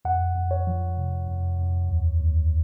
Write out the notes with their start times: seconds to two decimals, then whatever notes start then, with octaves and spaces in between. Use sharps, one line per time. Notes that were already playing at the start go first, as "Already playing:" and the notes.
0.05 F2 F#5
0.36 F2
0.51 C#5
0.67 F3
0.97 C3
1.28 F2
1.59 F2
1.89 D#2
2.20 D#2